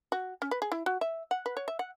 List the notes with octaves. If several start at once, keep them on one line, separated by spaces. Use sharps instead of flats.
F#4
C#4
B4
G#4
E4
F#4
E5
F#5
B4
C#5
E5
F#5